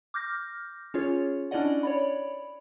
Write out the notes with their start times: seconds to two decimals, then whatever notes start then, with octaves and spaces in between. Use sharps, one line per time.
0.14 D6 F6 G6 A#6
0.94 C#4 F4 G#4 C#5
1.51 C#4 D4 E4 D5 D#5 F#5
1.83 C#5 D5 B5